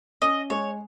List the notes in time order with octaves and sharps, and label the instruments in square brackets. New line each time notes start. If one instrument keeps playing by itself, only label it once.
[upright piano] C#4 [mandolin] D#5
[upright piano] G#3 [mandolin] C#5